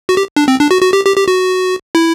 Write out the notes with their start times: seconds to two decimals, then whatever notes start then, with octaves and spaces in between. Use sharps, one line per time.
0.09 F#4
0.17 G4
0.36 D4
0.48 C4
0.60 D4
0.71 F#4
0.82 F#4
0.93 G4
1.05 G4
1.16 G4
1.28 F#4
1.95 E4